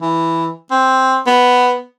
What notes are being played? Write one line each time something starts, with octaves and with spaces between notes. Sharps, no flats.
E3
C4
B3